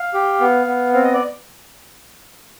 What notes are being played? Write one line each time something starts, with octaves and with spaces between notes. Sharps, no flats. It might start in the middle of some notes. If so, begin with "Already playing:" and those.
Already playing: F5
G4
B3
B3
C4 F5
D#5
D5